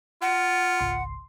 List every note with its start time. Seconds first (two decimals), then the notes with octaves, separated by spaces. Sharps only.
0.22 F4 F#5
0.80 G#1 C#2 C6